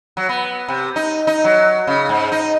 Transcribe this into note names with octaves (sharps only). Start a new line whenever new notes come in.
F#3
B3
C3
D#4
D#4
F#3
C#3
G#2
D#4